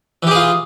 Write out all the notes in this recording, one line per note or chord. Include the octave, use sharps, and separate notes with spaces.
E3 F4 G4 G#4